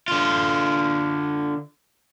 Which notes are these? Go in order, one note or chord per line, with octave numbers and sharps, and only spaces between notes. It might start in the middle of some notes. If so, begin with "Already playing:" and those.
D3 F4